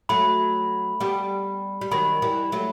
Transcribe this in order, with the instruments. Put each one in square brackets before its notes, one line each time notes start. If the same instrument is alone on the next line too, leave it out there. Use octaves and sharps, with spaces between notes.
[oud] F#3 A3 [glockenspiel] B5
[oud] G3 B3
G3
[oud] D#3 F#3 [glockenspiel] B5
[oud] E3 G3
F#3 A3